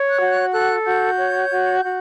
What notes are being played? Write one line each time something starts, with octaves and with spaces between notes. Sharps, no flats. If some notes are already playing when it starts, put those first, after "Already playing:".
Already playing: C#5
F#6
F#4
G6
F#6
A4 F#6
F#4 G6
C#5
F#4
F#4